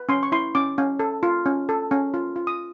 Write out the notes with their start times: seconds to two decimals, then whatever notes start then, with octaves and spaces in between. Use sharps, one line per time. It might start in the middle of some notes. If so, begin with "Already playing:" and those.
Already playing: B4
0.09 C#4 C6
0.23 C#6
0.32 E4 C6
0.55 C#4 D6
0.78 C#4
0.99 A4
1.23 F4
1.46 C#4
1.69 A4
1.91 C#4
2.14 F4
2.36 F4
2.47 D#6